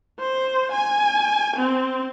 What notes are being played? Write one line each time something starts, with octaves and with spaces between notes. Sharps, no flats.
C5
G#5
C4